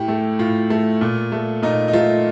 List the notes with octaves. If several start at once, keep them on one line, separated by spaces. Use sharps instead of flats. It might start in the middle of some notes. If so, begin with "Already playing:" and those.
Already playing: A2 G4
A3
A2 F4
A3
A#2
A3
A#2 D#4
D#4
A3 F4